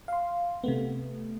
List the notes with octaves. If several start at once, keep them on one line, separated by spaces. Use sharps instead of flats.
F5 C6
C3 A3 B3